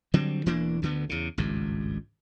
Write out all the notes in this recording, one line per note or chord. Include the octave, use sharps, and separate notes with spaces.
D3 F#3 G3 C4
E1 E3 A#3 D4
D2 D3 B3
E2 C#3
G#1 C#2 G2